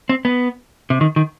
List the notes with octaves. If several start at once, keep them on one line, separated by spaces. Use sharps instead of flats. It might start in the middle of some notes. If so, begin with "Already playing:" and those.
C4
B3
C3
D#3
D#3